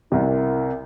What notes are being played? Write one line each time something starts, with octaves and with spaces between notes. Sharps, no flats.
C2 C3 E4 A#4